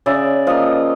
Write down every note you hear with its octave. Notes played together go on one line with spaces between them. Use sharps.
C#3 D5 E5
F3 A#3 D#5 F5